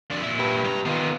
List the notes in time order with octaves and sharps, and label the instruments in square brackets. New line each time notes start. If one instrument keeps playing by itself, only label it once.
[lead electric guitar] F2 D4
A#2 E4
[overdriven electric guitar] G4 B4
[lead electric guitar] G2 A#5
[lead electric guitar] D#3 [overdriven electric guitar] B3 F4